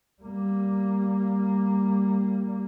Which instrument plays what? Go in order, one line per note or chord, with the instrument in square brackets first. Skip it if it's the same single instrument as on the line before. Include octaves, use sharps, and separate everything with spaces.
[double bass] G3 A#3